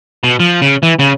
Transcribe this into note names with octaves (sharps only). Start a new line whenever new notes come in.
B2
F3
C#3
E3
C#3